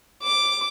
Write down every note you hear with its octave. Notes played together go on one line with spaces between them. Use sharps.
D6